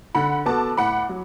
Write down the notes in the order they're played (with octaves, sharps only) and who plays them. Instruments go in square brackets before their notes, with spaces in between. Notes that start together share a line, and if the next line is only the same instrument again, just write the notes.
[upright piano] D3 [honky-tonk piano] F#5 B5
[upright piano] B3 F#4 A4 [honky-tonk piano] A5 D6
[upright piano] A2 [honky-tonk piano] F#5 B5
[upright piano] F#3